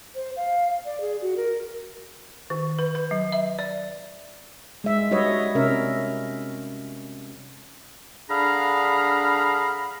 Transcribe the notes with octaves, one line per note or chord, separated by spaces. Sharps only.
C5
F5
D5
G#4
F#4
A#4
D#3
B4
B4
F#3
E5
D5
G#3 E5
G3 F#4 B4 C#5 D#5
C3 C#4 A#4 E5
D3 D4 G#4 F5 A#5 B5